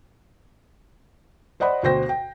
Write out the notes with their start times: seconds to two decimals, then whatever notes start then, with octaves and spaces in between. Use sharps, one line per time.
1.60 C5 D5 D#5 F#5 B5
1.83 D2 B2 F#4 C5 G5 A#6
2.09 G5